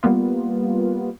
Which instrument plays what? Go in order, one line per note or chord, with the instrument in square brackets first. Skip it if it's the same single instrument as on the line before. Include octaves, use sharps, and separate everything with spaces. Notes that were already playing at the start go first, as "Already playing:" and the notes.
[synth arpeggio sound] G3 A#3 B3 F4